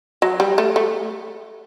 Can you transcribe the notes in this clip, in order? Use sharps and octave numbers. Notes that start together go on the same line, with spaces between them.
F#3
G3
A3
A3